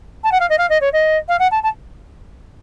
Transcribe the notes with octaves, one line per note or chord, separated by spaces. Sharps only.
A5
F#5
F5
D#5
F5
D#5
C#5
D#5
F5
F#5
A5
A5